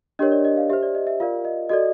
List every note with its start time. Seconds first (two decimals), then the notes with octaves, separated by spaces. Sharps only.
0.19 D4 G4 A#4 C#5 D#5
0.32 D5
0.45 D#5
0.57 F5
0.69 G4 C5 E5
0.83 D5
0.95 D#5
1.07 E5
1.20 F4 A#4 D5 F5
1.45 D#5
1.69 F#4 A4 D5 D#5